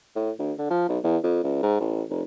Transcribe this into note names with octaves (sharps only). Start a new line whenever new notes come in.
A2
D2
D3
F3
B1
E2
F2
C#2
G#2
A1
F1